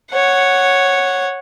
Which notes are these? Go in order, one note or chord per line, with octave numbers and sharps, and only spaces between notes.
C#5 F#5